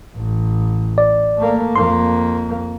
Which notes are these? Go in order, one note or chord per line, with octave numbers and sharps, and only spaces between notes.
A1
D5
A3 A#3
F2 A#3 C6